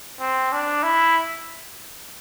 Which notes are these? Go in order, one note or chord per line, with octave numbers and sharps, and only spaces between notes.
C4
D4
E4